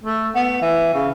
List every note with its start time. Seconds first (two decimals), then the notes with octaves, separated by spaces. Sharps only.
0.04 A3
0.35 B3
0.62 E3
0.94 C#3